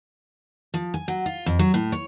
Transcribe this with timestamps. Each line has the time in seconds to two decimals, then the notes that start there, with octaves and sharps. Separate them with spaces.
0.74 F3
0.94 G#5
1.08 F#3
1.26 F4
1.46 F2
1.59 F#3
1.74 A2
1.92 C#5